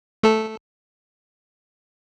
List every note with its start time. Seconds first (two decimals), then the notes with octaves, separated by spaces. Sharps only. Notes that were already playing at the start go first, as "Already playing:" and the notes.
0.23 A3 A4